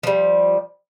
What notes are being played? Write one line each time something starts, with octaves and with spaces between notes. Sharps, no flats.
F3 G3